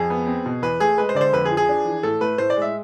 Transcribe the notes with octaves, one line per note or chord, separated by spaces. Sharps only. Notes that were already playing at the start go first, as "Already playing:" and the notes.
Already playing: F2 G#4
B3
C4
B2
E2 B4
A3 G#4
G#3 B4
C5
D3 D5
C5
F2 B4
G#4
F3
G#4
D4
E3
A2 A4
A3 B4
A2 C5
D5
G#3
E5